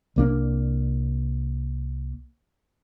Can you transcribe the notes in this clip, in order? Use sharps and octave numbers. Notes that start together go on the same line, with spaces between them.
C2 A#3 D4